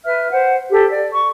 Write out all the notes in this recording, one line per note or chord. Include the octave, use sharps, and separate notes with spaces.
B4 E5 F6
C5 F#5
G4 A4
D5
C#6